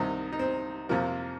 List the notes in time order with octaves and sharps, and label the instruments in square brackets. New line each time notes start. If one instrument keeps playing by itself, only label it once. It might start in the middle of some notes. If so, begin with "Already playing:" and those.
Already playing: [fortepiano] C2 C3 D#3 D#4
D#4
C4
F2 C3 F3 A#3